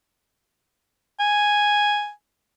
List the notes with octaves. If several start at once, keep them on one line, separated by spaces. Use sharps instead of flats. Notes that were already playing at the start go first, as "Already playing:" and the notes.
G#5